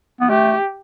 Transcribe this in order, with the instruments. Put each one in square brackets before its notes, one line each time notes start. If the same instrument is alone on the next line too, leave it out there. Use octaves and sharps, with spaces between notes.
[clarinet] B3
[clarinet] A3 [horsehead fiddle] G4